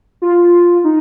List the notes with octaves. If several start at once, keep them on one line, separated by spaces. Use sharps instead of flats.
F4
D#4